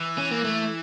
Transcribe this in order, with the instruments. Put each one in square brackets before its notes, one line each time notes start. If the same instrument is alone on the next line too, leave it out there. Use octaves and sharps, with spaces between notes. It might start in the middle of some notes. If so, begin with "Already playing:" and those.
Already playing: [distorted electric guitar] E3
[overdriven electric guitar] C#4
A#3
A3